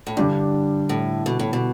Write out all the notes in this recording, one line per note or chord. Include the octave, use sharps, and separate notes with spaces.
A2
G2 D3 G3 D4
A2
B2
A2
B2